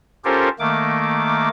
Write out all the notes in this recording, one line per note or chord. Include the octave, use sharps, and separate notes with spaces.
C#4 F4 G4 A4 A#4 C5
D#3 A3 A#3 D6